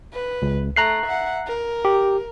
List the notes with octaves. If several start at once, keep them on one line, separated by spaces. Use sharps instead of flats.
B4
C#2
A3 A#5 F#6 C7
E5 F#5
A#4
G4